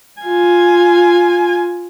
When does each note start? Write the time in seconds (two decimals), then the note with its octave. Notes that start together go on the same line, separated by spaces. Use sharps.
0.22 F4 G#5